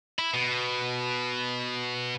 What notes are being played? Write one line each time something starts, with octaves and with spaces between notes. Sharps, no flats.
E4
B2